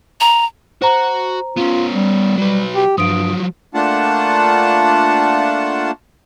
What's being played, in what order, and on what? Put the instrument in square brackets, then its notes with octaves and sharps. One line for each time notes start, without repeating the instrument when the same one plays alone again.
[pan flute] A#5
[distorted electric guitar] F#4 [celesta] C5 A#5
[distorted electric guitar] B3 C#4 [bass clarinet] F4
[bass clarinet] G3
[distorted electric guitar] F#3 B4 [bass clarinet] G3
[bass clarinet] G4
[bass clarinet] G2 [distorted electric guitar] F3 F#3 [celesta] D#6 D7
[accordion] A3 A#3 D4 F4 F#5 A5